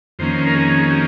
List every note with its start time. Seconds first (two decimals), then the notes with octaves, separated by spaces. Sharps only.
0.19 F2 D#3 A#3 C#4 C5
0.47 A#4
0.55 G#4
0.90 G4